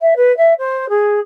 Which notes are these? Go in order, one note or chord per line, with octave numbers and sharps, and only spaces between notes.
E5
B4
E5
C5
G#4